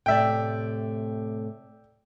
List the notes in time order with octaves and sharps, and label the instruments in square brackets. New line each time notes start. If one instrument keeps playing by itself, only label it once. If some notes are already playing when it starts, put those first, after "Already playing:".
[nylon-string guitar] A2 C3 A3 [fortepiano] D5 E5 G5